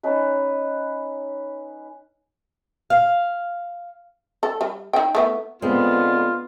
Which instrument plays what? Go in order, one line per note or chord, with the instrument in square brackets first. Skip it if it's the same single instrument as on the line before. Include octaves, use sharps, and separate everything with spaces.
[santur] C#4 D#4 B4
[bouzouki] F5
[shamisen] A4
G3
D#4 G5
A3 B3 E4
[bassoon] D3 [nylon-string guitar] G#3 C4 [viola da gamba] B3 [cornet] F4